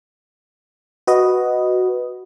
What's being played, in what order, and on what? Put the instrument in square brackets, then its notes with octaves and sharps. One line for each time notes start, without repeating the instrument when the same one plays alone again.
[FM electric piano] F#4 B4 D#5